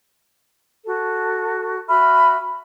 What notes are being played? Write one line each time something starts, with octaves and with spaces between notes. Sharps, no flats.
F#4 A4
F#4 E5 B5 F6